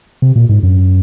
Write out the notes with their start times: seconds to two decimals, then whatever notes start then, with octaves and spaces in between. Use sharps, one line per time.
0.22 C3
0.36 A#2
0.49 G#2
0.63 F#2